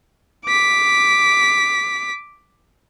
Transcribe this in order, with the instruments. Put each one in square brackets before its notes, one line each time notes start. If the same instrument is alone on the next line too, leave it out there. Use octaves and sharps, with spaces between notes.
[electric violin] D6 B6